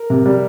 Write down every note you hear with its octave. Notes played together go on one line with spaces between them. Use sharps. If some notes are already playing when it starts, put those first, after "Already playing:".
Already playing: A#4
C3
G3